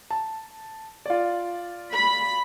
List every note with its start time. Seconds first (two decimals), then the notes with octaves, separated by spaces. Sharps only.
0.11 A5
1.06 F4 D5
1.93 B5